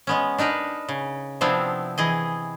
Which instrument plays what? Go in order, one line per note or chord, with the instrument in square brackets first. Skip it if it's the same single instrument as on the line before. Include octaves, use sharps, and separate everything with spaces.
[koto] G#3 B3 C#4
D4 D#4 A#4 B4
C#3
C3 F3 B3 C4 D4 E4
E3 G#4 D#5